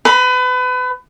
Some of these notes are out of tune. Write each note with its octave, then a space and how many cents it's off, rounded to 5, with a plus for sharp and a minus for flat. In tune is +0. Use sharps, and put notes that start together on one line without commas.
B4 +30 B5 -30